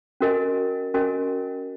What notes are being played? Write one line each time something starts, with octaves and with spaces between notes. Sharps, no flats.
C#4 F#4 A#4 D#5 G#5
C#4 F#4 A#4 D#5 G#5